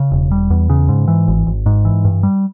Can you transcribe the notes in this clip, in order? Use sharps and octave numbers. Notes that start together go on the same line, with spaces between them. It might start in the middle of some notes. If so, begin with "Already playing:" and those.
Already playing: C#3
E1
G3
E2
C#3
G#2
E3
G#1
G#1
G#2
E3
G2
G3